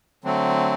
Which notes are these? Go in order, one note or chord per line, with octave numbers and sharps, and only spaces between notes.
D3 F#3 A3 C4